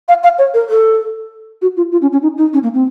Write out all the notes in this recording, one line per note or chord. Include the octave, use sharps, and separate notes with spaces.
F5
F5
C#5
A#4
A4
F#4
F4
F4
C#4
C#4
D#4
D#4
C#4
A#3
C4